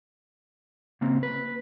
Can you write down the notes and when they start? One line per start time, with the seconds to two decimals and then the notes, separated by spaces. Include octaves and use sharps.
1.01 C#3 A#3 C4
1.23 B4